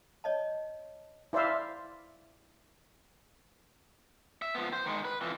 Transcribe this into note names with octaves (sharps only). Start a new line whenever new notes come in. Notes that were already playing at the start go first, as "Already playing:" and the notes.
C#5 D#5 A5
E4 C5 D5 E5 F5
E5
F3 B3
C5
D#3 G#3
B4
F2 E3